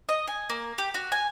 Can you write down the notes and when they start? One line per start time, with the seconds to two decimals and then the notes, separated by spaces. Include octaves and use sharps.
0.09 D#5
0.28 G#5
0.50 A#3
0.78 G4
0.94 F#4
1.12 G#5